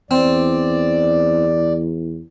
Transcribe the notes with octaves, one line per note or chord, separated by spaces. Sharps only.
E2 C4 D5